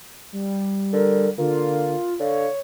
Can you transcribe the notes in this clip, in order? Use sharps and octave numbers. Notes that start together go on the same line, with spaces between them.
G3
D3 A#4
D3 A#3 F4
D3 C#5 F5